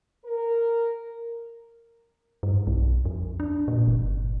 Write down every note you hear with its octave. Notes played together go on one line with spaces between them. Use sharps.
A#4
G2
B1
F2
D4
A#2
G1